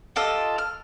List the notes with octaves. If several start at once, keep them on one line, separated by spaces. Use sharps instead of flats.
F4 G4 A4 D#5
F6